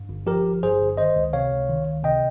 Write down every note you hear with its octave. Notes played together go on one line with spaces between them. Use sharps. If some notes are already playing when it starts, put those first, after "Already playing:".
Already playing: G2
G1
F3 G4 A#4
G1
G2 G#4 C5
G1
D#3 C5 D#5
C#2
C3 C#5 F5
C#2
D#3
C#2
C3 D#5 G5